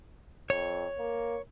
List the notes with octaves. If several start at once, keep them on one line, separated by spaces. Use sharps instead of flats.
F2 C#5
A#3